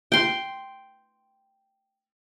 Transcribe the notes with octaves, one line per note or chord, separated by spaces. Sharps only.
G5 C6